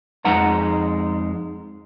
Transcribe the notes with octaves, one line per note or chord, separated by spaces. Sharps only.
F2 G#3 D#4 F#5 A#5